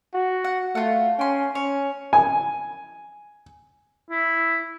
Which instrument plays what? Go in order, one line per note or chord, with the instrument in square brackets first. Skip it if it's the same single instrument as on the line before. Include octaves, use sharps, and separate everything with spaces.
[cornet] F#4
[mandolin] F#5
[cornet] A3 [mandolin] F4 F#5
[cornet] C#4 [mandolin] G5 C6
[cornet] C#4 [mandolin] C#5
[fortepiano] G#5
[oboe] E4